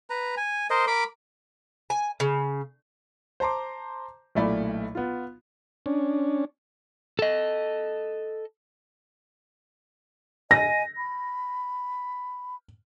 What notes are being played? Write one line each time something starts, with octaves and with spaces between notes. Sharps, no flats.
B4 A#5
G#5
A#4 C5 D#5
A#4 B5 D6
G#5
C#3
C5 A5 A#5 C6 D6
B1 A#2 A3 E4 D5 B5
B3 F4
C#4 D4
A4 D#5
D#5 G#5 A#6
B5